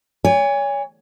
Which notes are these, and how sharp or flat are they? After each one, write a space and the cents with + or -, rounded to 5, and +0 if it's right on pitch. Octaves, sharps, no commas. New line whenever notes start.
C#5 +30 G#5 -25